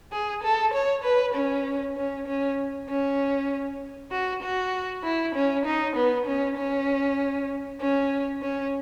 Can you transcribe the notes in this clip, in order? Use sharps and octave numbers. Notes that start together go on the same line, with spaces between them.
G#4
A4
C#5
B4
C#4
C#4
C#4
C#4
F#4
F#4
E4
C#4
D#4
B3
C#4
C#4
C#4
C#4